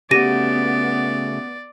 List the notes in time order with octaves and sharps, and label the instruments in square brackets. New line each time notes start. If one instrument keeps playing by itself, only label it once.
[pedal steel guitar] C#3 A3 F#4 [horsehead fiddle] B3 [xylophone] G4 A#6 D#7 [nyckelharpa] D5